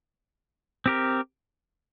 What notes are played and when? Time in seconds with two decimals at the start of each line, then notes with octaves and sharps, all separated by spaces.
0.86 C4 G4 A#4